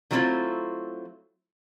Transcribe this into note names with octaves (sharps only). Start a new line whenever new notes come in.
D#3 F#3 A3 C4 E4 F4